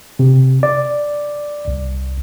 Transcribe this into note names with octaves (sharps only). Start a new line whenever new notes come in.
C3
D5
C2